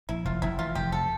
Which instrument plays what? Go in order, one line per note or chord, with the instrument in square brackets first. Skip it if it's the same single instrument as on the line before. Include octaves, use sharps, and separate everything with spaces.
[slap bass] A#1 [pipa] E4
[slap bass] F1 [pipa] F4
[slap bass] F1 [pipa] E4
[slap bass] E3 [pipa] F4
[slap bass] F1 [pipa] G4
[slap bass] F1 [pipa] A4